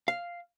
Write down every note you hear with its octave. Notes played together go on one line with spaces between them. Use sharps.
F5